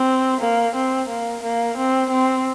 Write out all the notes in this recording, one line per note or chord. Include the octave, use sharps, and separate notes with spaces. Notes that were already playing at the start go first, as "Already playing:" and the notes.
Already playing: C4
A#3
C4
A#3
A#3
C4
C4